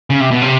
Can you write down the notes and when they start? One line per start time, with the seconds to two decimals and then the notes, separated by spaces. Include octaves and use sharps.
0.10 C#3
0.20 C3
0.31 B2
0.41 C3